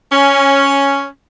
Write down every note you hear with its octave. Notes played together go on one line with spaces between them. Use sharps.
C#4